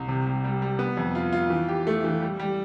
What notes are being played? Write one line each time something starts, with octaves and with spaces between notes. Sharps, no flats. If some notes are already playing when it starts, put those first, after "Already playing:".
Already playing: C2
C3
G3
G3
G3
B3
F2
F4
F4
E3
G4
A3
E3
G3
G3